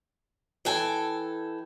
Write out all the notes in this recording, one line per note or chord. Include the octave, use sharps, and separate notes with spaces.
E3 A4 G5 G#5